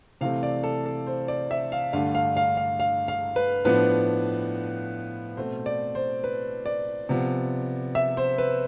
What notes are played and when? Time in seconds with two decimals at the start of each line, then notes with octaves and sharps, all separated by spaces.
0.21 C3 E3 A3 C4 F5
0.43 D5
0.64 A4
0.85 A4
1.07 C5
1.28 D5
1.51 E5
1.72 F5
1.93 G2 D3 A3 F5
2.15 F5
2.37 F5
2.57 F5
2.80 F5
3.08 F5
3.36 B4
3.65 A2 F3 B3 D4 B4
5.37 B2 A3 C4 C5
5.66 D5
5.95 C5
6.24 B4
6.66 D5
7.09 C3 F3 B3
7.95 E5
8.17 C5
8.38 B4